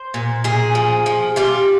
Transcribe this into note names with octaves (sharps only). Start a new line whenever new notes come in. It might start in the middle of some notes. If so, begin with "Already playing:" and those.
Already playing: C5
A#2
A#2 G#4
F3
F3
G3 F4